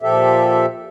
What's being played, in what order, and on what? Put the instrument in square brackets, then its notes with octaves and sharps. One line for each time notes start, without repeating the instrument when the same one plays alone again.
[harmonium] A#2 F3 G4 A4 E5